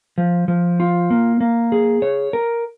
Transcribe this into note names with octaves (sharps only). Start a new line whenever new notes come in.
F3
F3
F4
A#3
A#3
G#4
C#5
A#4